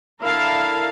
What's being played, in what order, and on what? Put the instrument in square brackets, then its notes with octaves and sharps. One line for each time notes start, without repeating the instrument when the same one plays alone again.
[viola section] D3 E4 A#4 F5 A5